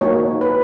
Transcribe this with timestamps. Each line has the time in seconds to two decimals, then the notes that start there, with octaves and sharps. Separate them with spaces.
0.01 A#3 D#4 F#4 C#5
0.41 B4